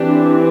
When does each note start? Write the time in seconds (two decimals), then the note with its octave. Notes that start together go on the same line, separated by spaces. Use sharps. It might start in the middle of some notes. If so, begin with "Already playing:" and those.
Already playing: E3 C4 D4 G4